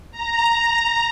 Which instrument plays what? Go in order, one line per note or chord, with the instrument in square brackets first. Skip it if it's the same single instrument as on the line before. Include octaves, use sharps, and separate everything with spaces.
[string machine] A#5